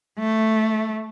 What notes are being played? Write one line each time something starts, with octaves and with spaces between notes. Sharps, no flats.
A3